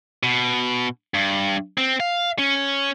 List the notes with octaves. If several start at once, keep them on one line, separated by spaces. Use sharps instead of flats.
B2
G2
C4
F5
C#4